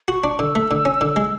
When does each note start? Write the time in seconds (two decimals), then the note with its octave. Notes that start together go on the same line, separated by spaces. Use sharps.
0.08 F#4 C#6
0.24 D4
0.39 D3 E6
0.55 A3
0.71 D3
0.85 C#4
1.01 D3
1.16 G#3